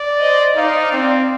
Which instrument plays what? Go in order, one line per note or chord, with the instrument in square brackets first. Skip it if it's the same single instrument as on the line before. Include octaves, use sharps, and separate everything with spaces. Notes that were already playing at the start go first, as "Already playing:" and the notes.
Already playing: [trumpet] D5
[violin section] C5 D#5
[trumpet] D#4 [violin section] D5 F5
[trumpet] C4